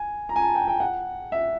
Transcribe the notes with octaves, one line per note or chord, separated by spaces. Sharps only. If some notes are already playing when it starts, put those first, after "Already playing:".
Already playing: G#5
A#5
G#5
A5
G5
G5
F#5
E5